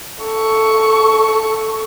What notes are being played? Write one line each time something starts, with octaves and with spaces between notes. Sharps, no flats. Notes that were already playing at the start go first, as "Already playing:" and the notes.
A4 C#6